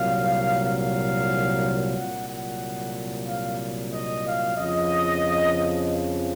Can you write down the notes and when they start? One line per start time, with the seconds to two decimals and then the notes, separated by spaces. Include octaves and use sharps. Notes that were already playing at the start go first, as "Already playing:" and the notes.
Already playing: C2 A#2 F#3 F5
0.66 F5
1.95 C2 A#2 F#3 F#5
2.28 F#5
3.26 F5
3.92 D#5
4.25 F5
4.57 F2 C#3 F3 D#5